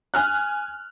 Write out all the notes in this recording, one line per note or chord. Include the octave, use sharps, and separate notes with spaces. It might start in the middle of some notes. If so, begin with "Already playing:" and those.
G#5 F6 F#6